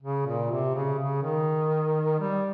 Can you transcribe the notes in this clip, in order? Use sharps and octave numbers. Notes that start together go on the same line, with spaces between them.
C#3
A#2
C3
C#3
C#3
D#3
G3